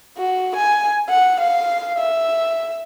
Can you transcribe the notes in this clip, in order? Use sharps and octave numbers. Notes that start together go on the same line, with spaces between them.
F#4
G#5
F#5
F5
E5